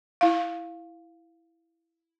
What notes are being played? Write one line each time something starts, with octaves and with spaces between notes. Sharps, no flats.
E4 F5